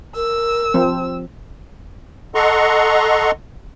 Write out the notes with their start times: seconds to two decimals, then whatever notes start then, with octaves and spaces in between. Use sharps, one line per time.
0.16 A#4 E6
0.74 F3 C4
2.35 A4 D#5 F#5 A#5 C6 C#6